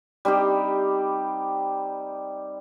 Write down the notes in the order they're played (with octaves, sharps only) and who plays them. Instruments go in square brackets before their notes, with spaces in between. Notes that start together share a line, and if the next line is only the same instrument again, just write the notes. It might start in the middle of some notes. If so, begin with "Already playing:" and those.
[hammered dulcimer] G3 C4 D#4 G4